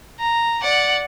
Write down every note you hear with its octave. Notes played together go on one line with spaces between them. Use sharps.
A#5
D5 F#5